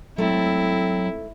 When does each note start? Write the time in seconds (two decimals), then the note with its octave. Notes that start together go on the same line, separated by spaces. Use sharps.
0.18 G#2 F#3 A3 C4 E4